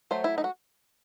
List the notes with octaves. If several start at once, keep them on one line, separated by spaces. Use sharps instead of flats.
F#3 A3 C5
E4
D#4
F#4